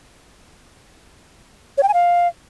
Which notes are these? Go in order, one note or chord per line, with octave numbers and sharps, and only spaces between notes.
C#5
G5
G#5
F5